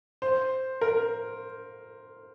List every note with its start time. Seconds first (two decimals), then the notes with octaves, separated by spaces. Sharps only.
0.22 C5
0.81 A#4